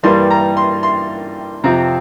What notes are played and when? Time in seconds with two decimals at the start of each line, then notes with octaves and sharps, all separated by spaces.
0.03 G2 E3 G3 A#3 C6
0.30 A#5
0.57 C6
0.83 C6
1.64 F2 C3 F3 C4 A#5